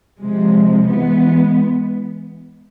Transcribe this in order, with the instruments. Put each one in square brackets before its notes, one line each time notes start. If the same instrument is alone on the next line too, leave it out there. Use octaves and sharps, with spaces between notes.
[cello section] C3 F3 G#3
E3 G#3 B3